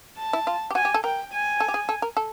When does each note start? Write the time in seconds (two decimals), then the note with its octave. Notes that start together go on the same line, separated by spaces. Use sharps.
0.18 A5
0.33 E4
0.47 F4
0.71 G4
0.75 F#4 G#5
0.85 G4
0.94 A4
1.04 A#4 G5
1.32 G#5
1.60 A4
1.68 G4
1.74 G#4
1.89 A4
2.02 A#4
2.17 A4